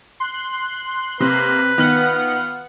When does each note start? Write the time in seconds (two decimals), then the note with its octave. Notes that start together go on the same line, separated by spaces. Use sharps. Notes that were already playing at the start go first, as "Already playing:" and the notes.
0.20 C6 F#6
1.20 C3 A#3 B4
1.78 D#3 B3 F4 F#5 F#7